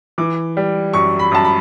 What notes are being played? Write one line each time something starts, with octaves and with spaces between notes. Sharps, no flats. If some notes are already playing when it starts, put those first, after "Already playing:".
E3 D6
G3
F#2 C#6
B5
F#2 A5
B5